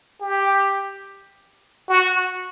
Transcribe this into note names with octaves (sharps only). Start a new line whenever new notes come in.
G4
F#4